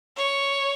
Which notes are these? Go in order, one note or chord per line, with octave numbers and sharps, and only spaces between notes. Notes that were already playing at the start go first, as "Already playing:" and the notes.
C#5